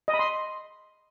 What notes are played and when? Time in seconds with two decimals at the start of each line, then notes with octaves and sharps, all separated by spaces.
0.08 D#5
0.14 B5
0.19 C6